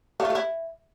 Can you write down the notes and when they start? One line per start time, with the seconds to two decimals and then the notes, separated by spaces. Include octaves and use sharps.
0.20 A3
0.25 F4
0.30 A3
0.35 E4